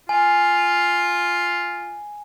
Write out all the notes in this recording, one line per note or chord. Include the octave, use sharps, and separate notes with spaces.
F4 G#5